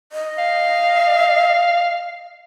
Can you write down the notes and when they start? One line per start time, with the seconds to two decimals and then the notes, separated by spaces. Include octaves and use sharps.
0.12 D#5
0.38 F5